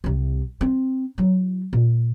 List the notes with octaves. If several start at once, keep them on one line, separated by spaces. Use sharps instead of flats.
C2 C3
C4
F#3 E4
A#2